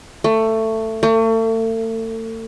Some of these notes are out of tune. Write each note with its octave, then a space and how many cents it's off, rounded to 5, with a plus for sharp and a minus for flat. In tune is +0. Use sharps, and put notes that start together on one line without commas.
A3 +15
A3 +40